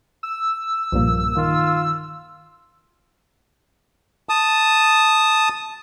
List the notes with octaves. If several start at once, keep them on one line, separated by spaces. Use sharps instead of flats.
E6
B1 G2 A#2 F3 A#3
D#3 F4
A5 D#6